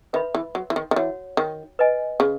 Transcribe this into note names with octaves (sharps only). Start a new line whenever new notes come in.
D#3 B4 E5 B5
E3
F#3
E3
D#3
D#3
E3 F#4 C#5 F#5
D#3
B4 D#5 G#5
C#3